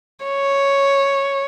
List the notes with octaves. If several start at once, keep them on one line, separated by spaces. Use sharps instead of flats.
C#5